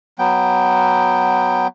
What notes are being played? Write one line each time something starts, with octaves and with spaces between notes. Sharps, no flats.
F#3 B3 G5